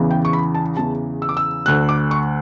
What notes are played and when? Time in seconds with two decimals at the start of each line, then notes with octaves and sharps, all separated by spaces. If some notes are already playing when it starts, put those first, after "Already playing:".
Already playing: E2 C#3 E3
0.11 G5
0.25 C#6
0.33 B5
0.55 A5
0.77 E2 C#3 E3 A5
1.22 E6
1.29 D6
1.37 E6
1.66 D2 D3 F#6
1.89 D6
2.11 C#6